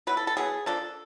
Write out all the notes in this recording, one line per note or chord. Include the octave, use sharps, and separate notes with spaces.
F#3 B3 E4 B4
A4
A4
F#3 B3 E4 G#4
F3 A#3 D4 A4